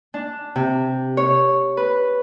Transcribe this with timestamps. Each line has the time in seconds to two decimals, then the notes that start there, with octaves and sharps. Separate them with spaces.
0.14 D4
0.56 C3
1.17 C#5
1.77 B4